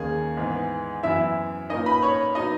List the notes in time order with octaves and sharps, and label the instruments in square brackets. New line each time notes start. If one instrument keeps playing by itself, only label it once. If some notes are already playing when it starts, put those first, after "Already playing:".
Already playing: [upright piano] D#2 D#3 A#3 C#4 G#4
G#2 E3 B3
F#2 E3 B3 E4 E5
A#2 A#3 C#4 D#4 D#5
B4 B5
C#5 C#6
F#3 B3 D#4 D#5